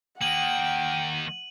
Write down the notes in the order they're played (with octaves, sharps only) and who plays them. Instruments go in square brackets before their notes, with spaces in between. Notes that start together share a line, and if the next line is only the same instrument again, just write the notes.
[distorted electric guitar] D#3 A#3 [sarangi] F#5 [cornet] G5 [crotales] D#7 F#7